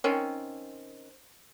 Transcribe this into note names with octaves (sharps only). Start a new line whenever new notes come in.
D#3 C4 C#4